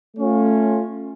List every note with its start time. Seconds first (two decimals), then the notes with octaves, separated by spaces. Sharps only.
0.16 A3 C#4 F4